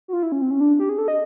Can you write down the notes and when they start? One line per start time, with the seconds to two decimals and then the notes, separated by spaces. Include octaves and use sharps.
0.08 F#4
0.13 F4
0.23 E4
0.32 C#4
0.42 C4
0.51 C#4
0.61 D4
0.80 G4
0.89 G#4
0.98 A4
1.08 D#5